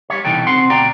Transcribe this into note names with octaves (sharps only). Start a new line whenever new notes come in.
G3 C#5
C2 B2 E3 D#4 A4 G5
C4 F#5 C6
D2 B2 F#4 D5 G5 A#5